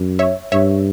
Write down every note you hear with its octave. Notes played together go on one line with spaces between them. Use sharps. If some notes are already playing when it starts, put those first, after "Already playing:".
Already playing: F#2
C#5 E5
G2 C#5 E5